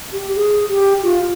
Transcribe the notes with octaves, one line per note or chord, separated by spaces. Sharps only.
G4
G#4
G4
F4